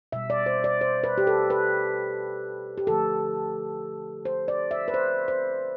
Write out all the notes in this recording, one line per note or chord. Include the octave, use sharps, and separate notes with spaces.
B2 G3 E5
D5
C5
D5
C5
B4
G4
A4
B4
G4
D3 F3 A3 A4
C5
D5
E5
B4
C5
C5